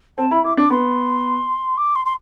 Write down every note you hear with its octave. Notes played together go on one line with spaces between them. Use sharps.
C4 A5
E4 B5
E4 D6
D4 D6
B3 C6
D6
C6
C6